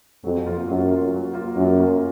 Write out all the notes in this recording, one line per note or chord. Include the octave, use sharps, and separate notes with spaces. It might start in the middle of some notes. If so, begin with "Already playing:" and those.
F2 F#3
A#3 F4
F#2 F#3
A#3 F4
F#3
A#3 F4
F#2 F#3
A#3 F4